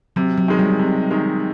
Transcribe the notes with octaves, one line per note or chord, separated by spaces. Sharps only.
C3 F#3
F#3
D#3 G#3
G3
C3
D#3 G#3